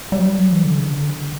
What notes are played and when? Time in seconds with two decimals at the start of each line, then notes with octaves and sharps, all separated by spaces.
0.12 G3
0.19 F#3
0.26 G3
0.39 F#3
0.52 E3
0.65 D3
0.78 C#3
0.91 D3